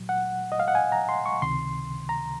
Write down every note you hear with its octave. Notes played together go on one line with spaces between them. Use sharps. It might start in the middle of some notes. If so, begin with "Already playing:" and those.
Already playing: A#2 F#3
F#5
D#5
F5
F#5
G#5
A#5
C6
C#6
C#2 C3 D#3 C6
A#5